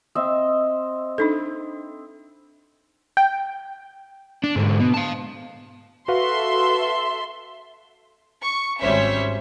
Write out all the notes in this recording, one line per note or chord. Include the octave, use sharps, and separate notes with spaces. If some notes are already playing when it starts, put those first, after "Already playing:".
C4 D#5 E5
D4 D#4 A4
G5
D4
G#2 D3
B2
F5 A5
F#4 A4 B4 E5 F5 C6
C#6
G#1 G3 C#4 C5 C#5 E5